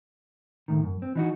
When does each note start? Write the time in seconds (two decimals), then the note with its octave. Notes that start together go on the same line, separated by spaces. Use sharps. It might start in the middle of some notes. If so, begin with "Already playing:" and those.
0.68 D2 A2 D#3
0.84 F#2
1.02 C4
1.15 E3 D#4 F#4